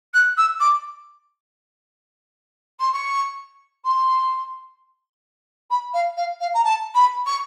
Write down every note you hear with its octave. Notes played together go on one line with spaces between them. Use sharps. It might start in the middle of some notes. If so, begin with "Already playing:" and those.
F#6
E6
D6
C6
C#6
C6
B5
F5
F5
F5
A#5
A5
B5
C#6